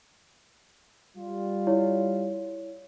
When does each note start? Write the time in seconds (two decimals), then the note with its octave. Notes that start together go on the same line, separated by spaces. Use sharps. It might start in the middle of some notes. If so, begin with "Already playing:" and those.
1.17 G3 F4
1.67 E4 C#5